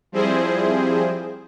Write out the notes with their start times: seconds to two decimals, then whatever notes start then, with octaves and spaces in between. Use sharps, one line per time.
0.12 F3 G3 C4 E4 G#4 C5